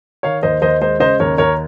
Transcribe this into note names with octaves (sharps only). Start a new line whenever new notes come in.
D#3 C#5 F5
D#2 C5 D#5
D#2 C5 D#5
G#3 C5 D#5
C#3 C5 D#5
D#2 A#4 C#5
D#2 A#4 C#5